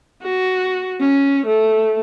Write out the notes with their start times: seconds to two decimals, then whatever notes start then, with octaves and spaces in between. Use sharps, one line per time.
0.22 F#4
1.00 C#4
1.46 A3